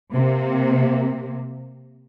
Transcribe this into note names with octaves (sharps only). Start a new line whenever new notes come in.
C3 A#3